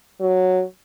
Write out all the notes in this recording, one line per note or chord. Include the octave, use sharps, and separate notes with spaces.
F#3